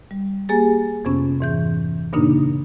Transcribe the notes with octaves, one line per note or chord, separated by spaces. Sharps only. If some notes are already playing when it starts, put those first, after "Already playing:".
G3
A#3 G4 G#4 G#5 A6
F2 C3 B3 C#4
G#2 E3 G6
G2 A#2 C#3 A#3 D4 D#4